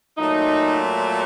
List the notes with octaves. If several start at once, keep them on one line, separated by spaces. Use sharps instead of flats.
A#2 F#3 A3 D#4